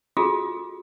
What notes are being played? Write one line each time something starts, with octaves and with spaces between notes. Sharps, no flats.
F4 F#4 G#4 A4